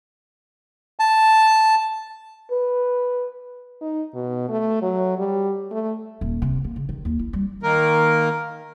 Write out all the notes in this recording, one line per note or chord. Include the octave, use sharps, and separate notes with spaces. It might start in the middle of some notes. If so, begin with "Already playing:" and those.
A5
B4
D#4
B2
A3
F#3
G3
A3
D#1
C3
A#3
C#3
D#3
D#2
E4
G3
D#3 A#3 A#4